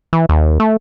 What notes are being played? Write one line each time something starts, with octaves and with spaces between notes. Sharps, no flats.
E3
D#2
A3